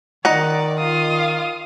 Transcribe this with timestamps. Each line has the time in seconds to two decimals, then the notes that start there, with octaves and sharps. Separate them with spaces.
0.25 D#3 D#4 D5 F#5 A#5
0.80 F4 F5 D#6